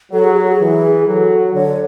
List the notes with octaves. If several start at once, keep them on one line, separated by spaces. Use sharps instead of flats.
F#3 A4
G#4
F#4
G#4
E3
F#3 A4
D3 C#5